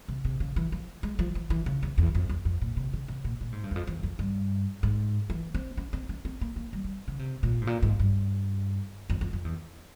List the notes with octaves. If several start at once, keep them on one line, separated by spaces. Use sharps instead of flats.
C3
C3
C#3
E3
F3
G#3
F3
E3
E3
C#3
E2
E2
F2
E2
F2
A#2
C3
C#3
C3
A#2
A#2
G#2
G2
E2
F2
E2
F2
G2
G#2
E3
C4
C#4
C4
C#4
C4
A#3
A#3
G3
G3
C#3
C3
A#2
G#2
A#2
G#2
G2
F2
F2
F2
E2